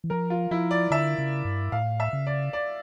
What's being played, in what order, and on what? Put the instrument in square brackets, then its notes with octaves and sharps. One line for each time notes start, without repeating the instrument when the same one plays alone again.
[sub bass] E3
[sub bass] F3 [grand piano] A#4
[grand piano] F4
[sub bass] F3 [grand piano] E4
[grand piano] D5
[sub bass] D3 [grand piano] E5
[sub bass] C#3
G2
[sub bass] A2 [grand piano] F5
[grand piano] E5
[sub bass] C#3
[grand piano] D5
D5